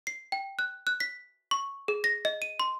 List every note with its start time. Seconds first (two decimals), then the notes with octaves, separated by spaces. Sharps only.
0.07 C7
0.32 G5
0.59 F#6
0.87 F#6
1.00 B6
1.51 C#6
1.88 G#4
2.04 A#6
2.25 D#5
2.42 D#7
2.60 C6